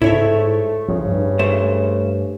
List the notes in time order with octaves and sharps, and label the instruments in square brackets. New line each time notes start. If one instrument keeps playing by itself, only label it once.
[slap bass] G#2 [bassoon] A3 [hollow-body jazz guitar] E4 C#5 E5
[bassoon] C#3 [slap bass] F3
[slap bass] G2
[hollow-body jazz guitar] A3 C5